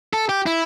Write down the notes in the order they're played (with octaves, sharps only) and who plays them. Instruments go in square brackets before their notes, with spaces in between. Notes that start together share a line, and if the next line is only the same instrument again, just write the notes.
[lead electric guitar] A4
G4
E4